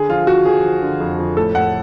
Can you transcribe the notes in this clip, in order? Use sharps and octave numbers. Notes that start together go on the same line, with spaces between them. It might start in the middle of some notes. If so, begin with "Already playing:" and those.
Already playing: D3 G#4
F3 F4
F3 F#4
F3 G#4
F3
D3
F2
F2
A2 A4
A2 F#5